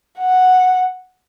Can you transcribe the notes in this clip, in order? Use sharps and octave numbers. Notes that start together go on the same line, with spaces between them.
F#5